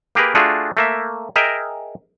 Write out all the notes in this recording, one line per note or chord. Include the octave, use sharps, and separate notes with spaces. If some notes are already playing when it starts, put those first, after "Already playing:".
A#3 G4 G#4 A#4 B4
A3 D4 F4 F#4 G#4
A3 A#3 E5
G#4 A#4 D#5 E5 G5